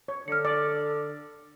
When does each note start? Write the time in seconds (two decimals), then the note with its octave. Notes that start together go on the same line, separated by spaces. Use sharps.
0.08 C#5
0.28 D3 F6 C#7
0.45 D5